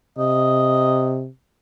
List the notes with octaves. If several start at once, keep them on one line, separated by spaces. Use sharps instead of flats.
C3 D#5